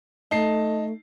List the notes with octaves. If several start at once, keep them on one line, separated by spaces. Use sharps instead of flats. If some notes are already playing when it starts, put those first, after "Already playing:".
A3 D#4 A5 C7